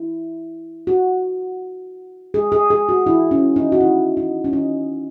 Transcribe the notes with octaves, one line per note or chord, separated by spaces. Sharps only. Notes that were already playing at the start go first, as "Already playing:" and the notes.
Already playing: E4
F#4
G#4
G#4
G#4
F#4
E4
C#4
D#4
F#4
E4
D#4
C#4
D#4